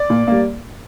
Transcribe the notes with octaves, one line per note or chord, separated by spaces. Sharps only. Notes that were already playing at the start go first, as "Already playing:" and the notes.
Already playing: D5
A#2
G3 A#3